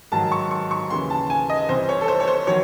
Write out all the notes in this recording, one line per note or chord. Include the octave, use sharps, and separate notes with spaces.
G#2 D#3 F#3 A5
C#6
C#6
C#6
D#2 C#3 E3 C6
A5
G#5
D#5
C2 C3 E3 C5
C#5
A4
C5
C#5
C5
D#3 F#3 C#5